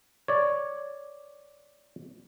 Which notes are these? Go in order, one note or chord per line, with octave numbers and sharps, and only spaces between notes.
C#5 D5